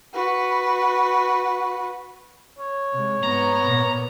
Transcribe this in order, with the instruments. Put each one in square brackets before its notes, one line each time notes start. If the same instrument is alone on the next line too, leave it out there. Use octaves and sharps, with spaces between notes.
[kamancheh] F#4 B4
[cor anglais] C#5
[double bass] C3 G#3
[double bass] G#2 [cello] B3 [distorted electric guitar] A#5
[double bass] A#2